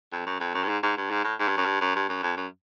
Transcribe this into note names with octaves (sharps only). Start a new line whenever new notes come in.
F2
F#2
F2
F#2
G2
G#2
G#2
G2
G#2
A2
G#2
G2
F#2
G2
F#2
G2
F#2
F2
F#2